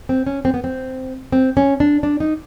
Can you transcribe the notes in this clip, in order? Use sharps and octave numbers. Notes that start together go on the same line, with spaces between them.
C4
C#4
C4
B3
C4
C4
C#4
D4
D4
D#4